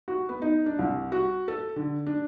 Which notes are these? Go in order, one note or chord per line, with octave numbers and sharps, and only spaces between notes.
F#4
B3
D#4
D4
C2
F#4
A4
D3
D4